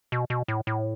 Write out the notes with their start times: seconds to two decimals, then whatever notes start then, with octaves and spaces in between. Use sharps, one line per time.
0.12 B2
0.30 B2
0.48 A2
0.67 A2